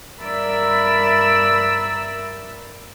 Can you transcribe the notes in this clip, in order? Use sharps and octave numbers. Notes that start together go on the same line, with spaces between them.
G2 A#4 D5 E5 B5 E6